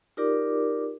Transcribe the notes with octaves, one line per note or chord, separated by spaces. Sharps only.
D#4 F4 G4 A#4 D5 D6